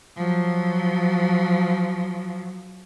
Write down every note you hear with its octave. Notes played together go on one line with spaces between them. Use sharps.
F3 F#3